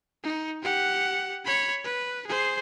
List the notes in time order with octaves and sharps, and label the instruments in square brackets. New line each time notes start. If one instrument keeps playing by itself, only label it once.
[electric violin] D#4
G4 F#5
C#5 B5
B4
G#4 C5